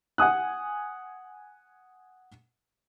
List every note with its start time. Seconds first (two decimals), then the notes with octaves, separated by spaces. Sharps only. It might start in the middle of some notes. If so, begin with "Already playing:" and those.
0.18 F#5 G#5 D#6 F#6